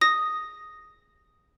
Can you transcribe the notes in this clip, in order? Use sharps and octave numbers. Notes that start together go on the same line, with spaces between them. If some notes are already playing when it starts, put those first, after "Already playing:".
D#6 A#6